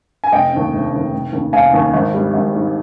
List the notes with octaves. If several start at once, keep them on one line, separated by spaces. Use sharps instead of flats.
G#5
F1 D#5 G5
D#2 C#3
F1
D#2 C#3
F1
D#2 C#3
F1 F5 G#5
D#2 C#3
G#1
G#2 G3
G#1
G#2 G3